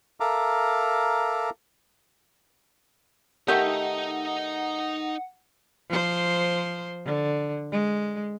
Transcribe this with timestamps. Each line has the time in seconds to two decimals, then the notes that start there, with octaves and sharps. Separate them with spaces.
0.20 A4 A#4 E5 F5 A#5 D6
3.48 D#3 A3 D#4 G4 D#5 F#5
5.90 F3 C5
7.05 D3
7.72 G#3